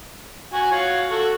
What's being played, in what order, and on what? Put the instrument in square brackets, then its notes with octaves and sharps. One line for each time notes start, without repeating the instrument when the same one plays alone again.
[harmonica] F#4 G#5
F4 F#4 C#5
F#4 A4